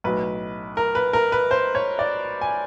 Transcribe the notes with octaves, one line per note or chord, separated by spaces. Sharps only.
B1 A2 F#3 B4
A#4
B4
A#4
B4
C5
C#5
D5
G#5